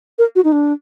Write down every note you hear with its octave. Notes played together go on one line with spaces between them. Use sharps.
A#4
F#4
D#4
D4